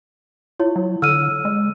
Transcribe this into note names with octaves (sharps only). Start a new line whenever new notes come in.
E4 F4 C#5
F#3
D3 E6 F6 D#7
G#3